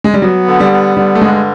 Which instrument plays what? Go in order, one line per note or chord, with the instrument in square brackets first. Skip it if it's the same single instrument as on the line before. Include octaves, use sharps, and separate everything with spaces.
[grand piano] G#3
G3
[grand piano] F#3 [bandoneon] B3
[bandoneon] D3
[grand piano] G3
[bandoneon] B3
[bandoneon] D3 [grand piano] G3
[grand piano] A3
[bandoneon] G2 [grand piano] G#3